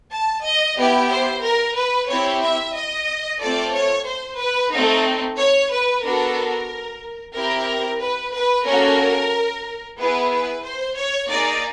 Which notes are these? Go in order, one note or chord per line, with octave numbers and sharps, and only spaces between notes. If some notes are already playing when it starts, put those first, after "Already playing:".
A5
D#5
B3 E4 G4
C5
A#4
B4
C4 E4 G4 C#5
E5
D#5
A3 C4 F4 A4 D5
C#5
C5
B4
A3 C4 D#4
C#5
B4
B3 D4 F#4 A4 A#4
C4 E4 G4 A#4
B4
B4
A#3 C#4 F#4 A4 A#4
B3 E4 G#4 B4
B4
C5
C#5
A#3 D#4 G#4 D5